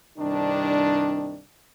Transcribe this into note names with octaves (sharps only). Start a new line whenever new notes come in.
C2 G2 D#3 C4 D4